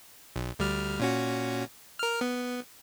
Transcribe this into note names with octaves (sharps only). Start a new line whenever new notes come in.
B1
D2 G3 F6
A#2 C#4 F#4
A#4 F6
B3